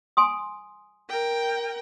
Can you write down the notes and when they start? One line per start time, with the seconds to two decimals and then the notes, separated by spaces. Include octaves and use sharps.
0.17 G#5 C6 D#6
1.09 A#4 G5